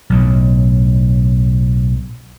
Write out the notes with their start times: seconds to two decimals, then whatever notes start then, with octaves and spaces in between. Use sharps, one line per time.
0.10 B1 A2